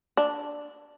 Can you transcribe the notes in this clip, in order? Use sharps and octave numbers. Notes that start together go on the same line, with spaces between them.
D4